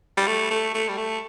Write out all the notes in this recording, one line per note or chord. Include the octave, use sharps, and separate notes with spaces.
G3
A3
A3
A3
G3
A3